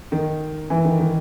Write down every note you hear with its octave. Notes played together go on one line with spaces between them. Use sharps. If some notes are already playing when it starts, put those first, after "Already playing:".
D#3
E3
D#3
D#3